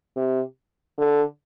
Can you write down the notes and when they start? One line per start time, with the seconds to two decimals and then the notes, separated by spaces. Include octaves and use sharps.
0.16 C3
0.98 D3